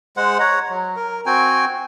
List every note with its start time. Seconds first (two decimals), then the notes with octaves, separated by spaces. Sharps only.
0.17 G#3 C5 F#5
0.40 C#5 F#5 A#5
0.70 F#3
0.96 A#4
1.26 C4 F#4 G5 G#5